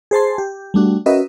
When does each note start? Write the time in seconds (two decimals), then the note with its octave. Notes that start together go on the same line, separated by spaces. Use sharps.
0.11 G#4 C5 A5 C6
0.38 G4
0.74 G3 A3 D4 F#4
1.06 C#4 F#4 A#4 B4 D#5 E5